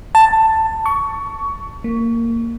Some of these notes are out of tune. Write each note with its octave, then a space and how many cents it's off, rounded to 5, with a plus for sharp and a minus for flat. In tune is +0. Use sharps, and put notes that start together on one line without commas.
A5 +10
C#6 +25
A#3 -15